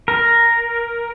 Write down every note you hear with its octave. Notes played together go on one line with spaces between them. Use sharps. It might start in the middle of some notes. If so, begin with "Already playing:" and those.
A#4